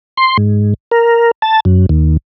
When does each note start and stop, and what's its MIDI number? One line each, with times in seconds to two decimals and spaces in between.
0.17 0.37 84
0.38 0.74 44
0.91 1.31 70
1.42 1.60 81
1.65 1.86 42
1.89 2.17 39